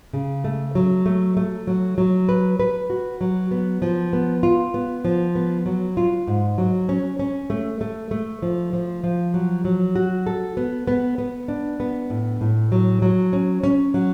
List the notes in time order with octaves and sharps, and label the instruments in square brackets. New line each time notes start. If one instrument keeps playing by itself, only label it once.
[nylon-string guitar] C#3
A3
F#3
A3
A3
F#3
F#3
B4
B4
F#4
F#3
B3
F3
B3
F4
B3
F3
B3
F#3
F4
G#2
F#3
C#4
C#4
A3
A3
A3
F3
F3
F3
F#3
F#3
F#4
A4
B3
B3
B3
D4
B3
A2
A2
F#3
F#3
C#4
C#4
F#3